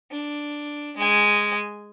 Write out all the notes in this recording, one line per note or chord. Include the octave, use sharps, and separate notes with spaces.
D4
G#3 G#5